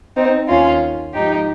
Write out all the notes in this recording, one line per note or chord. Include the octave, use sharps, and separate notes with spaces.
C4 D#4
D#2 D#3 C#4 F4
G#2 F3 D#4 G4